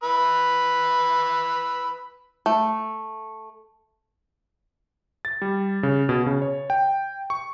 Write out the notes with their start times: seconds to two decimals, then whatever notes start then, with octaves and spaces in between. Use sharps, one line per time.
0.03 B4 E6
2.46 A3
5.25 A6
5.42 G3
5.83 C#3
6.09 B2
6.26 C#3
6.42 C#5
6.70 G5
7.30 C#6